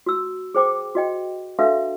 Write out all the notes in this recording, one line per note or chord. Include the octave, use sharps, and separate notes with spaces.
F#4 E6
G#4 C5 G5 D6
F#4 D#5 G5
D4 F#4 A4 B4 E5 F5